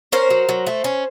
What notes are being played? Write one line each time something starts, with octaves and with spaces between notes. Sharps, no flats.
C#4 A#4 C5
F#3
F#3
A3
C#4